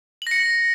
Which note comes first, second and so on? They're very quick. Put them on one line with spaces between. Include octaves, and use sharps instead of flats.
F#7 A#6 C#7